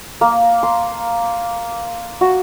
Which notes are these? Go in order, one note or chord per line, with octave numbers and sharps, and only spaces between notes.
A#3
C6
F#4